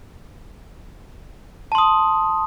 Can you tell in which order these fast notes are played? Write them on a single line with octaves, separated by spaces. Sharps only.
A5 C6 D#6